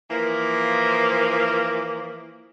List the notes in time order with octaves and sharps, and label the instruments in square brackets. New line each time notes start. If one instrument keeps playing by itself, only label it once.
[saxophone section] E3 F3 A#3